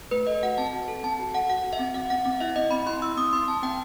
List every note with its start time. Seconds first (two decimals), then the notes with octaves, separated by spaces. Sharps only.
0.11 A3 B4
0.27 A4 D#5
0.43 F#4 F#5
0.58 C4 A5
0.73 C4
0.88 A4
1.04 C4 A5
1.19 F#4
1.34 A4 F#5
1.50 F#4 F#5
1.64 F#4
1.73 E5
1.79 C4
1.94 C4 F#5
2.10 C4 F#5
2.25 C4 F#5
2.40 E4 E5
2.56 C4 D#5
2.71 C4 B5
2.86 E4 C6
3.01 E4 E6
3.17 C4 D#6
3.33 C4 C6
3.48 C4 A5
3.62 C4 G5